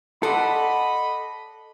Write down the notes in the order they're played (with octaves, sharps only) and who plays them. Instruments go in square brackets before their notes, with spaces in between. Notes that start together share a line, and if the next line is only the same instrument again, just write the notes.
[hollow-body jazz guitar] A4 [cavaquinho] D5 F#5 C6 [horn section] D#5 B5